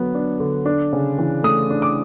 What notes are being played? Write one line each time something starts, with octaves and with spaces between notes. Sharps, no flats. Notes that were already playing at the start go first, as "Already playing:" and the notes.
Already playing: D3 F#3 B3
D4
D3
D4
C#3
E3
A3 D#6
D4
D6